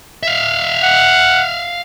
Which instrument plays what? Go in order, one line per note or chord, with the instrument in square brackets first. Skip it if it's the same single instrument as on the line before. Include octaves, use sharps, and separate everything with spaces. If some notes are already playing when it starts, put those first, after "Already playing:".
[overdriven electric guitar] E5 F5
[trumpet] F#5